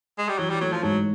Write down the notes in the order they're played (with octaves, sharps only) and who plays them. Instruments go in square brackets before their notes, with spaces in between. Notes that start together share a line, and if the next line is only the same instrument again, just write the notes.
[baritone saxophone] G#3
G3
[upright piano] E3 [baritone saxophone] F#3
[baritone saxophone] G3
[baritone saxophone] F#3 [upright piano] A3
[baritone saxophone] F3
[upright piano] G#2 [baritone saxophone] F#3